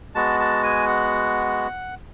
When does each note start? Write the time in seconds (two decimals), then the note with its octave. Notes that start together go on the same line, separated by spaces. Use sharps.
0.15 G#3 B3 F#4 A5
0.40 A5
0.64 G#5
0.88 F#5